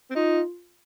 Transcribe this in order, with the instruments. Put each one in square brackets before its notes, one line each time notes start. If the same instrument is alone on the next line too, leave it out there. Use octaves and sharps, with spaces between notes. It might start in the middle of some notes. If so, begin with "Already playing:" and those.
[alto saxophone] C4
[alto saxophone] D#4 [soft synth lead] F4